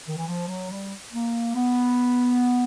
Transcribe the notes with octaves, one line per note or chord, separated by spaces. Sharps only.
D#3
E3
F3
F#3
G3
A#3
B3